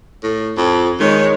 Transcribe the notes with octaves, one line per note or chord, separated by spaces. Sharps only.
A2
F2
D#3 G#3 C#5